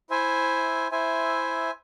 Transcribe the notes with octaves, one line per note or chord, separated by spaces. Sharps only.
E4 C5 E5 G#5
E4 C5 E5 G#5